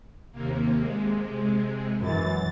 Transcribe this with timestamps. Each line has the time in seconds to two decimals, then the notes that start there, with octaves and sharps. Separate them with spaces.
0.32 D#2 C3 A#3
0.75 C3 G#3
2.02 F#2 E3 A6